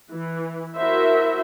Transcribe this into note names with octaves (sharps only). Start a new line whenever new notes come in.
E3
E4 F#4 A#4 C5 E5